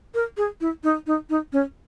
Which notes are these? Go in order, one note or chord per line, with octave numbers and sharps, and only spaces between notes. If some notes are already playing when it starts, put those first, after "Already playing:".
A#4
G#4
E4
D#4
D#4
D#4
C#4